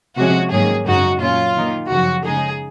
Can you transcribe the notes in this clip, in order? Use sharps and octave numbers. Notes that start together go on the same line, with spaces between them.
C3 F3 G#3 C#4 F#4
G#2 D#3 F#3 A#3 C#4 G#4
F#2 C#3 G#3 D#4 F#4
A#2 F#3 C#4 F4
D#3 A#3 D#4
F#2 C#3 F3 F#4
C#3 G#3 D#4 G#4